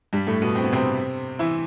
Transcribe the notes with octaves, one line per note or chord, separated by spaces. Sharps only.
G2 G3
A2 A3
B2 B3
C4
B3
C3 C4
E3 E4